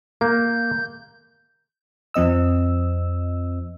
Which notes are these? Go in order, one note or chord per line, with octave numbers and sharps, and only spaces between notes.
A#3 G6
F2 F3 C4 D#5 E6